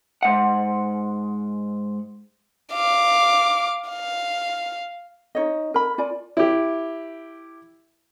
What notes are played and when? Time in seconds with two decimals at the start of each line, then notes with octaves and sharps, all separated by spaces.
0.23 G#2 F#5
2.73 F5 D6
3.89 F5
5.35 D#4 C#5 D#5
5.74 A#4 B5
5.98 F4 D5 G#5
6.37 E4 G4